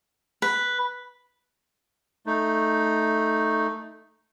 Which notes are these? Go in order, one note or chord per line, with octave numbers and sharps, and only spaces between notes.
B4
A3 D#4